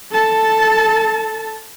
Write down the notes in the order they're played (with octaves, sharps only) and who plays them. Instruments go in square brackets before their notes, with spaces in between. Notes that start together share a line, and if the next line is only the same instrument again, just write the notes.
[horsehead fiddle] A4 A5